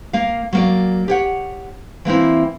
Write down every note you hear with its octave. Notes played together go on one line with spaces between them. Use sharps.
A#3 F5
F#3 A#3 D5
G4 C#5 F#5
E3 A#3 C4 E4